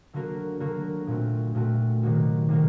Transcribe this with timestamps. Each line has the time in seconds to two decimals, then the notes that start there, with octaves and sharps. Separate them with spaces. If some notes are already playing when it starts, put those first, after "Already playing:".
0.13 D3 F#3 A#3 F#4 A#4
0.60 D3 F#3 A#3 F#4 A#4
1.07 A#2 A3 C4 F#4
1.55 A#2 A3 C4 F#4
2.03 C3 D#3 F#3 A#3 F#4
2.48 C3 D#3 F#3 A#3 F#4